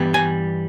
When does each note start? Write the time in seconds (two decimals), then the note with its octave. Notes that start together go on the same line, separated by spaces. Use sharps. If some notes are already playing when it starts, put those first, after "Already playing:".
Already playing: G2 E3 G3 B3
0.14 G#5